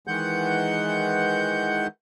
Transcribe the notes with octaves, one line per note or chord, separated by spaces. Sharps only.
D#3 E3 G#3 F#5 G6